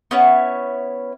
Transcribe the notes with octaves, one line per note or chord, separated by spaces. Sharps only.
B3 C#4 E4 C#5